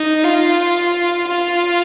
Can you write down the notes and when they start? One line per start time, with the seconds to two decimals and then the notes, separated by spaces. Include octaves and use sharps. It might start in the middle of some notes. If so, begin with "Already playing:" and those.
Already playing: D#4
0.24 F4
1.28 F4